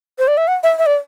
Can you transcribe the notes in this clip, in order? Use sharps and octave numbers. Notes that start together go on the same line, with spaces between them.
C5
D5
E5
F#5
E5
E5
D5